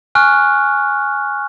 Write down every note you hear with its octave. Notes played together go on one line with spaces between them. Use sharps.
G#5 C#6 F6 F#6